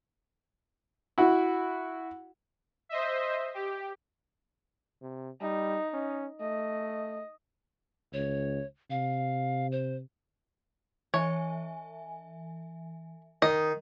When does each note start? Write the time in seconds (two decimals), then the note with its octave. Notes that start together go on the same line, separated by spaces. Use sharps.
1.18 E4 F#4
2.89 C5 D#5 E5
3.54 G4
5.02 C3
5.41 G3 D#4
5.93 C#4
6.41 A3 D#5
8.13 C#2 C#5
8.90 C3 F5
9.72 C5
11.14 E3 C#5 E5 G#5
13.42 D#3 D#5